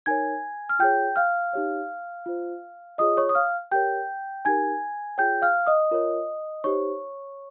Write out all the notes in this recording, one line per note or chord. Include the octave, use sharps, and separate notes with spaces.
D#4 A#4 C#5 G#5 G#6
F6
F4 G#4 C#5 G5 G6
F5 F6
D#4 G4 C#5
F4 C5
F4 G#4 C#5 D#5 D#6
C#5 C#6
D#6
F5 F6
G4 A#4 C#5 G5 G6
D#4 G4 A#4 G#5 G#6
F4 G#4 C#5 G5 G6
F5 F6
D#5 D#6
F4 A#4 C#5
D#4 G4 C5 C#5 C#6